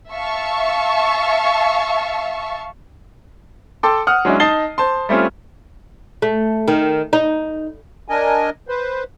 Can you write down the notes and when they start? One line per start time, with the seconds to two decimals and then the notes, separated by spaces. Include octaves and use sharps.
0.11 E5 F5 A5 C#6
3.83 A4 G5 A5 C6 D6
4.07 F#5 D#6 F6
4.25 F#3 G#3 C#4 D4 E4
4.40 D#4 D#5 A5 A6 C7 G7
4.78 C5 A5 C6
5.09 G3 A3 C4 C#4 F4
6.22 A3
6.68 D#3
7.13 D#4
8.08 D4 A#4 D#5 G#5
8.68 B4 C5